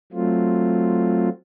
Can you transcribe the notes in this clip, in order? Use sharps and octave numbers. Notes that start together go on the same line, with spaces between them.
F#3 A3 C4 F4